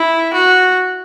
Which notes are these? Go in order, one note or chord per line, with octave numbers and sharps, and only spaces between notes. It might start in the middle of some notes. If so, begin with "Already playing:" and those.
Already playing: E4
F#4